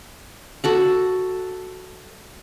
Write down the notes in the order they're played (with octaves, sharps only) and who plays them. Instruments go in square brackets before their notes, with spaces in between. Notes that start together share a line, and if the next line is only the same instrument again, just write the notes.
[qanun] F#4 A4 F#5